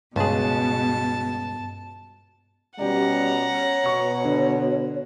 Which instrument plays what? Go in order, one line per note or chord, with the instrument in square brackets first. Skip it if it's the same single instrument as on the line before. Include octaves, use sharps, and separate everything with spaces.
[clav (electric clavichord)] C#2 G#4 [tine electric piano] G2 [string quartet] B2 [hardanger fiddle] A5
[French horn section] B2 G3 C#4 [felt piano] G4 D5 [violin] F#5 A#5
[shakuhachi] C#5
[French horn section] B2 [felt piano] C#6
[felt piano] D3 D4